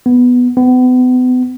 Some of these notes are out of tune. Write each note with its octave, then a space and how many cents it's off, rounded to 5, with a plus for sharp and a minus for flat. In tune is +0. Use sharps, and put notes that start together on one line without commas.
B3 +0
B3 +35